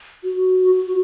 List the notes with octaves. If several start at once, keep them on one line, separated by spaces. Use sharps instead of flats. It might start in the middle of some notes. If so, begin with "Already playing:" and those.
F#4